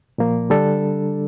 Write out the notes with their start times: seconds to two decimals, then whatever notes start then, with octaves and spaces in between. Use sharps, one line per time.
0.18 A#2 F3 A#3
0.50 D3 G3 D4 A4